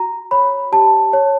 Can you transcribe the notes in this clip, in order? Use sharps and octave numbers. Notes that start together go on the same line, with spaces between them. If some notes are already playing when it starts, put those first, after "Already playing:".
Already playing: F#4 A#5
C#5 B5
G4 A5
C#5